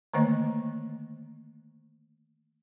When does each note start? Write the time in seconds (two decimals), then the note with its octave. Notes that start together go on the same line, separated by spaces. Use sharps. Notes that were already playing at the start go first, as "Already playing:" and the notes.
0.14 D3 D#3 A3 A#3 C#5 D#5